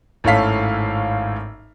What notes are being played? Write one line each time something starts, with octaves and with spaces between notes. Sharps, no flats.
G#1 A2 C#4 A4 F5 B6